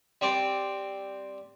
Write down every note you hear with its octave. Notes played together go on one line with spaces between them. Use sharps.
G3 C4 D5